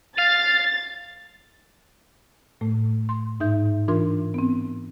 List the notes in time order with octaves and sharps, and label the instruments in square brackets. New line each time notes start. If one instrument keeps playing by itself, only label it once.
[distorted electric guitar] F5 [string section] A6
[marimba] A2 A3
C6
G#2 D#4 E5 G6
E3 D4 F4 A#4 C6
B3 C4